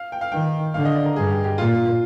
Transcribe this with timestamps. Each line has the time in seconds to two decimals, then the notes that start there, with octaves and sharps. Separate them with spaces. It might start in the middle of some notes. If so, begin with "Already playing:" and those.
Already playing: F5
0.12 G5
0.21 F5
0.32 D#3 G5
0.74 D3 F5
0.85 D#5
0.95 D5
1.05 A#4
1.16 G2 G#4
1.30 G4
1.44 G4
1.58 A#2 F4